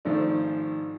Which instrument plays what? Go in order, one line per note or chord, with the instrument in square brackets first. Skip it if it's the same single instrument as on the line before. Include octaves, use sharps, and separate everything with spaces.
[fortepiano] G#1 G#2 F3 A3 D4